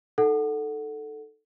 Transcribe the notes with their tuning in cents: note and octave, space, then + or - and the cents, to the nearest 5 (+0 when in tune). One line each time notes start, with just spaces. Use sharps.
D#4 +0 A4 +0 F#5 +0